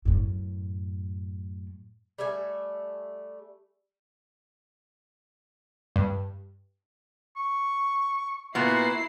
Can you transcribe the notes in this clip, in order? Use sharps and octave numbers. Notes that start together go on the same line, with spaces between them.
F#2 A2
G3 A3 E5 G#5
G2
C#6
A#2 B3 E4 F#4 C7